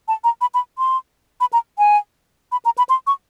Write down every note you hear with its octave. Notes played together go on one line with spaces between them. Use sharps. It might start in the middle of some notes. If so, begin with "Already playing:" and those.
A5
A#5
B5
B5
C6
B5
A#5
G#5
B5
A#5
B5
C6
C#6